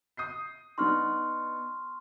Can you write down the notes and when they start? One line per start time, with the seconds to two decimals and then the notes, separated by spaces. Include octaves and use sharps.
0.17 D#6 G6 C7
0.78 B3 D4 D#4 C6 C#6 F6